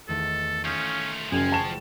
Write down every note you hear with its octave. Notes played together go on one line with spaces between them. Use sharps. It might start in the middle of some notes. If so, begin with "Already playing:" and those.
E2 D#3 A3 A4
A3 C#4 F4 D#6 G6 C7
F#1 F#2 F3 G5 G#5
A5 C#6 E7